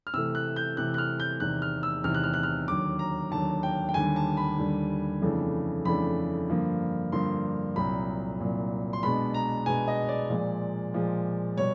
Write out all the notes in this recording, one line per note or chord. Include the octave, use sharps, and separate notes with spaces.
F6
C3 E3 A3 E6
F#6
G6
C3 E3 A3 F#6
F#6
F6
G6
E2 C3 D#3 F#6
F6
E6
E2 C3 D#3 F6
F#6
F6
F#6
F6
D#2 D3 F#3 D6
A#5
D#2 D3 F#3 A5
G5
G5
D#2 D3 G3 G#5
A5
B5
D#2 D3 G3
F2 C#3 E3 A3 D4
F2 C#3 E3 A3 D4 B5
G2 D3 F3 A#3
G2 D3 F3 A#3 C6
C2 A#2 F#3 B5
C2 A#2 F#3
C6
B2 G#3 B3 D4 B5
A#5
B2 G#3 B3 D4 G#5
D#5
D5
A#2 F3 G#3
A#2 F3 G#3
B2 G3 C#5